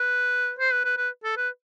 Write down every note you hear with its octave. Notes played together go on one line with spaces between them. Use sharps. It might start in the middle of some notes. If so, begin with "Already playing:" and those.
Already playing: B4
C5
B4
B4
B4
A4
B4